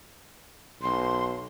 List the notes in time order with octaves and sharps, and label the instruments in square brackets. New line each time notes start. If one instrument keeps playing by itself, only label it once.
[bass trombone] B1 [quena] C6